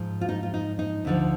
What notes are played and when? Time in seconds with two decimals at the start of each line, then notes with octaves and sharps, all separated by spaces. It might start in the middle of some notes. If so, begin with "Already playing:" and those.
Already playing: G#2 F3
0.21 F4
0.29 D#4
0.43 F4
0.54 D#4
0.79 D#4
1.05 D2 D3 F3